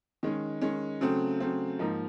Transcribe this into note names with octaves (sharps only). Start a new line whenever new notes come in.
D#3 G#3 C#4
D#3 G#3 C#4
C#3 F#3 A3 C4
C#3 F#3 A3 C4
G#2 F3 A#3 D#4